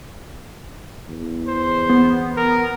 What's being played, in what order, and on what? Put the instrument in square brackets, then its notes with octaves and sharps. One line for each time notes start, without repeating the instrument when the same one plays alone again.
[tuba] E2
[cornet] C5
[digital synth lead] B3
[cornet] A#4